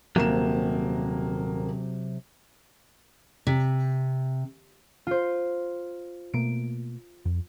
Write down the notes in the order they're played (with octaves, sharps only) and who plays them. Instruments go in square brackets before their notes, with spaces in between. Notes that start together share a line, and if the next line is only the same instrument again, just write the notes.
[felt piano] D#1 A#3 E7 [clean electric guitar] C3 F#3
[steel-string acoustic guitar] C3
[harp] F4 C5
[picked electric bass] B2 A3 A#3 [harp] D7
[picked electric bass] F2